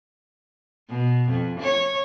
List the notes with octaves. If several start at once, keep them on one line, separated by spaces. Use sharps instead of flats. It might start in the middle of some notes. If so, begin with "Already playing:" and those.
B2
F2
C#5